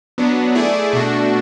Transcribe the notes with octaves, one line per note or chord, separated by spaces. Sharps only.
F#3 B3 D4
A3 E4 G#4 D5
B2 A3 D4 F#4